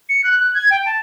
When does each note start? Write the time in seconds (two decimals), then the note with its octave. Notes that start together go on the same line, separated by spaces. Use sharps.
0.09 C#7
0.24 F#6
0.41 F#6
0.54 G#6
0.71 G5
0.86 A5